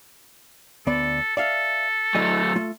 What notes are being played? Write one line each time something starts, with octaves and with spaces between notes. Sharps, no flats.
D2 B3 A4 D5
A4 D5 E5 F5
F#3 A3 E4 D#5 G#5
A3 F4